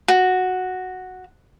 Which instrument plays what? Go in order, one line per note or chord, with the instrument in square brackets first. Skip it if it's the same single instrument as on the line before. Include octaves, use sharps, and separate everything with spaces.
[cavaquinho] F#4